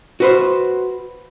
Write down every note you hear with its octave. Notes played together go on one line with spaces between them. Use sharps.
F#4 B4 C5